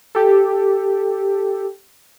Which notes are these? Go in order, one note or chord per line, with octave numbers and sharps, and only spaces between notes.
G4 A4